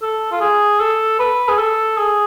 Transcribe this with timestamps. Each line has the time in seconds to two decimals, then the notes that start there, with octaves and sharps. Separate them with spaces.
0.02 A4
0.32 F4
0.41 G#4
0.80 A4
1.20 B4
1.48 G#4
1.58 A4
1.98 G#4